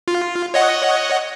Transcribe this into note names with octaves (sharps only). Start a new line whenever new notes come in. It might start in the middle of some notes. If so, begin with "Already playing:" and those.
F4
C#5 D#5 F#5